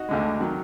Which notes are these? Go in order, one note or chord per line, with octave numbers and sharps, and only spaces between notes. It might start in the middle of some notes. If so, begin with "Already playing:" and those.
Already playing: D#4 F#4
D2 D3 G#3
D#3 F#3